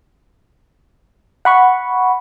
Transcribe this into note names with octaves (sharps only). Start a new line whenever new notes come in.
F#5 B5 C#6